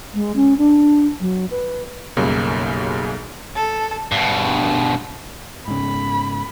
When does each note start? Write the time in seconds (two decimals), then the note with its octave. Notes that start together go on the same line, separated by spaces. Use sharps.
0.14 G#3
0.36 C#4
0.58 D4
1.20 F#3
1.51 B4
2.17 B1 F#2 C#3 G3 A#3
3.55 A4
4.12 G2 B2
5.68 G#2 C#3 B5